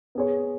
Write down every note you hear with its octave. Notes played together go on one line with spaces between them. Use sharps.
B3 G#4 C#5